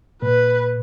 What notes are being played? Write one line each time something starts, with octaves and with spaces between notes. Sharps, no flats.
A#2 B4